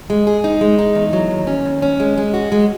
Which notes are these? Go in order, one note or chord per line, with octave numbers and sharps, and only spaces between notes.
G#3
G#4
D#4
G#3
D#4
E2
F#3
D#2
C#4
D#2
C#4
G#3
G#3
F#4
G#3